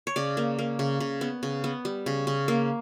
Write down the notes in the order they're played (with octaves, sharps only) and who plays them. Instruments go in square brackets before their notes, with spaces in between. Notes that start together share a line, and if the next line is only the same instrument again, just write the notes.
[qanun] C#5
C#3 D5
A#3
A#3
C#3
C#3
B3
C#3
B3
G3
C#3
C#3
A#3